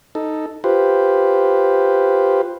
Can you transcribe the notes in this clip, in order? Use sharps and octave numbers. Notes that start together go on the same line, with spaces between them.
D#4 A4
F4 G4 B4 C5